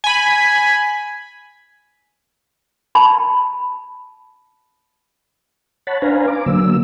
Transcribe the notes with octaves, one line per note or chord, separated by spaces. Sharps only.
G#5 B5
A5 B5
C#5 F#5 A5 B5
D4 B4 C5 F5 G#5 A#5
D6
D3 F#3 A#3 E6